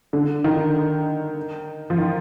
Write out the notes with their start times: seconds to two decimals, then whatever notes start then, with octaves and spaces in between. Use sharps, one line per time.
0.13 D3
0.44 D#3
1.90 F3
1.98 D#3